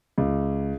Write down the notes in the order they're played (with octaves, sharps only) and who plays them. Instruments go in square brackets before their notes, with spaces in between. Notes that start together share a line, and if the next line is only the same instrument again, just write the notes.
[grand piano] C#2